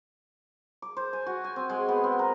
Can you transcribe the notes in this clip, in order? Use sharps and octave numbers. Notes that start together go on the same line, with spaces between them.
D6
C5
G#5
F#4
G#5
C4
G#3
B3
C4
A#4